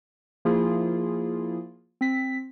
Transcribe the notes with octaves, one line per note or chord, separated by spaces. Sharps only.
F3 A#3 E4 F4 G#4
C4 B6